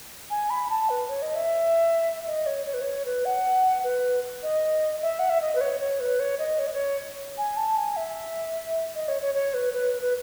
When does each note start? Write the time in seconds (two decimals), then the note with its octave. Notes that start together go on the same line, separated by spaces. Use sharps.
0.30 G#5
0.50 B5
0.70 A5
0.89 B4
1.09 C#5
1.22 D#5
1.35 E5
2.27 D#5
2.46 C#5
2.66 C#5
2.74 B4
2.81 C#5
3.05 B4
3.25 F#5
3.84 B4
4.43 D#5
5.02 E5
5.19 F#5
5.30 E5
5.42 D#5
5.55 B4
5.61 C#5
5.81 C#5
6.00 B4
6.20 C#5
6.39 D#5
6.59 C#5
6.67 D#5
6.74 C#5
7.38 G#5
7.57 A5
7.77 G#5
7.96 E5
8.95 D#5
9.08 C#5
9.22 C#5
9.34 C#5
9.54 B4
9.73 B4
10.02 B4